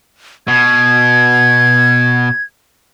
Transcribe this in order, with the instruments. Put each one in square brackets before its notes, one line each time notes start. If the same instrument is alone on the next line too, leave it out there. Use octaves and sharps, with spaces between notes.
[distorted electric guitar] B2 [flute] G#6